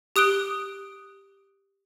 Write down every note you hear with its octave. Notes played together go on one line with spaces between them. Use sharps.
G4 D#6 F#6 D7 G7